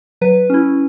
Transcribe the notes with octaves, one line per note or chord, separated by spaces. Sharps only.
F#3 B4
C#4 E4